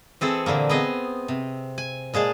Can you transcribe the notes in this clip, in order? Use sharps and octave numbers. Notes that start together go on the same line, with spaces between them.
E3 C4 G#4 A4
A#2 D3 E3 A#3
B3 C4 G#4 D#5
C3
G#5
A#2 G#3 G#4 A5